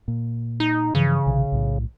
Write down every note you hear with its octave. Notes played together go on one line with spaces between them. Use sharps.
A#2
D#4
G2 C#3 E3 F3
A#1 C3 D#3
B1 A2